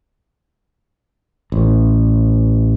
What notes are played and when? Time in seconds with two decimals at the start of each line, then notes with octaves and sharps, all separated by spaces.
1.52 A1